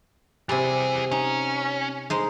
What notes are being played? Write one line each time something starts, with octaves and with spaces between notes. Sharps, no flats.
C3 E3 G3 G#4
C#4 D#4
G#3 D#4 C5